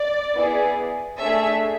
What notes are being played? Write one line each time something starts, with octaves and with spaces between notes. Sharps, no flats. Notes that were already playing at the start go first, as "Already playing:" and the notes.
Already playing: D5
B3 E4 G#4
A3 D4 G#4 E5